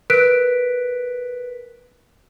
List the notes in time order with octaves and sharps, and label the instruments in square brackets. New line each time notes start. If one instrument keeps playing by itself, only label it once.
[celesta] A#4 B4 F#6 B6 D7